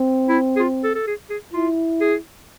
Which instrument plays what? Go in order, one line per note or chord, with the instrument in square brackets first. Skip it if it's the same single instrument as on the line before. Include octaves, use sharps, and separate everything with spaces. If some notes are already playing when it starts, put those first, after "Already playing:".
Already playing: [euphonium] C4
[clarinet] E4
G#4
F4
A4
A4
G#4
G#4
[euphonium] E4 [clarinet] F4
[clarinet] G#4